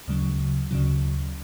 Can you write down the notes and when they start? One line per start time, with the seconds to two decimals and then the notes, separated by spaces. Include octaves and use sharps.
0.08 D2 C#3 F#3
0.71 D2 C#3 F#3